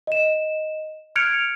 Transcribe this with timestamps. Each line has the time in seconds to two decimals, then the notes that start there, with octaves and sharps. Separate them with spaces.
0.07 D#5 E7
1.16 F6 F#6 G#6 C#7 D7 F7